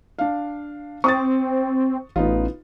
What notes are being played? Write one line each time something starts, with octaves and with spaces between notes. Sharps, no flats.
D4 F5
C4 C#6 D#6 A6
A1 B3 D#4 F4